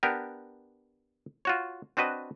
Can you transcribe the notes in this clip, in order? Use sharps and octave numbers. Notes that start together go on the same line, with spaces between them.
B3 D4 G4 A#4
F4 F#4 C#5
C4 D4 F#4 B4 D#5